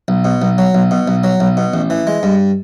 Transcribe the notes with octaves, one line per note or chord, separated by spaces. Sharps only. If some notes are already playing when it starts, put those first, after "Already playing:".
B1
B2
B1
F#3
B1
B2
B1
F#3
B1
B2
A1
E3
G#3
G2